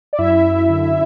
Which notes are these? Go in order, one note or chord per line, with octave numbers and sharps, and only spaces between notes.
D5
F#2 E4 E5
F#2
D3